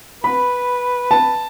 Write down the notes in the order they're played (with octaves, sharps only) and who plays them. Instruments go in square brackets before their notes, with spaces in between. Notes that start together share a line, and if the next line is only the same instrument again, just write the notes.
[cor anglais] B4 [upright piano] B5
[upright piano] A5